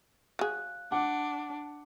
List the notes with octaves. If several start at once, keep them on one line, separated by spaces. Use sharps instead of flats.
F#3 G#4 F5 F#6
D4 F#5 D6